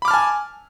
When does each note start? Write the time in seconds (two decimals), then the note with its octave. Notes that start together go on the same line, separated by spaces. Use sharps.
0.02 B5
0.05 D6
0.08 F6
0.11 A5
0.14 G#5